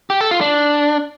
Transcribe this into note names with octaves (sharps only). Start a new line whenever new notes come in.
G4
A4
F4
D4